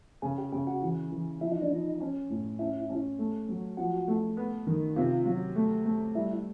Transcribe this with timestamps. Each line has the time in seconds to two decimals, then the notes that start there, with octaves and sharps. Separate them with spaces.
0.22 C#3 G#4
0.38 G4
0.52 C#3 G4
0.67 F#4
0.82 E3
1.12 E3
1.41 F3 E4
1.52 D#4
1.62 D4
1.71 F3 D#4
2.00 C#4
2.30 A2
2.59 C#4 E4
2.89 C#4
3.19 A3
3.49 F#3
3.77 F3 F#4
4.08 A3
4.37 B3
4.67 D#3
4.96 C3 F4
5.25 F#3
5.56 A3
5.85 A3
6.15 G3 E4